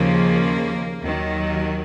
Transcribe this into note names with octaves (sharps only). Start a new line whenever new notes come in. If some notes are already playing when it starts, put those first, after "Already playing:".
Already playing: D#2 C#3 F3 A#3
D#2 D#3 F#3